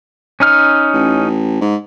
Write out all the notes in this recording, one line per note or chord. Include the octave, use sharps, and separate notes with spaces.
C#4 D#4 F6
A1
G#2